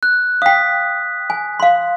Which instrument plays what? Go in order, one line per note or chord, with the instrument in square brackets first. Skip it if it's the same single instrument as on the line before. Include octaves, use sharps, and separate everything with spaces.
[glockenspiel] F#6
[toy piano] F5 G5 [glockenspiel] D#6 B6
[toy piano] G#5
F5 C6